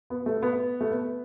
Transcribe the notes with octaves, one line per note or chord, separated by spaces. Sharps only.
B3
A3
B3
A3
B3